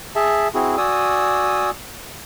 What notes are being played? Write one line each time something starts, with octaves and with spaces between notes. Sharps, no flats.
G#4 E5 A5
C4 E4 F#4 G#4
F#4 D5 G#5 D#6 E6